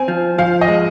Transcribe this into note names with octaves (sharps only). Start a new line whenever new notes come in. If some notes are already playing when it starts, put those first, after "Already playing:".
Already playing: C4 G#5
F3
F3 F5
D#5
G#3